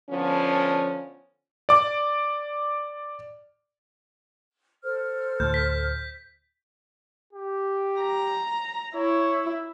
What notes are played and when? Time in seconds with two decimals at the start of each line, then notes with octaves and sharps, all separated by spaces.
0.10 D3 F3 B3 C#4
1.69 D5 D6
4.83 A4 C5 F6
5.40 D2 A2 G6
5.54 B6
7.33 G4
8.01 A#5
8.95 E4 C#5